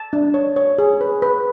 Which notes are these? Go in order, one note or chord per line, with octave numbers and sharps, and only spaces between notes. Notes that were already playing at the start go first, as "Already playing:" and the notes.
Already playing: A5
D4
C#5
C#5
G#4
B4
B4